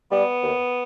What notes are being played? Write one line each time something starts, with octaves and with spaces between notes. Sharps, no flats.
G3 B3
D#2